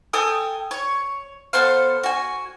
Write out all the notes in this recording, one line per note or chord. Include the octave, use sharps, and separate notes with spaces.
A4 G5 G#5 D#6
C#5
B3 A4 C5 F5
F#4 G#5